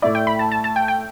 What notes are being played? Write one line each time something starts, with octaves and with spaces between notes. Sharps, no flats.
A2 A3 E4 D5
G5
B5
A5
A5
A5
G5
G5